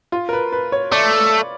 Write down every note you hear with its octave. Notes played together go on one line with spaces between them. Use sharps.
F4
A#4
B4
B4
C#5
A3 D5